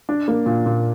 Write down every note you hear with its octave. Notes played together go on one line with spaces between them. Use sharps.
D4
A#3
A#2
A#2